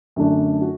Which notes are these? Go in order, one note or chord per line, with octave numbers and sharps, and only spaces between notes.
F#2 D3 A3 D4
F#4